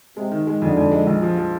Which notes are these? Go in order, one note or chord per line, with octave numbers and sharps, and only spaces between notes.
C3 G#3
D#3
G#3
F2 D3
F2
G#3
A#1
F3
F3